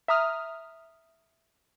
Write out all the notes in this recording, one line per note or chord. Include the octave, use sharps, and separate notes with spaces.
E5 A#5 D#6 F6